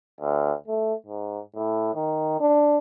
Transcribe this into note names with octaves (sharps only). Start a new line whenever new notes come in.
D2
A3
G#2
A2
D#3
D4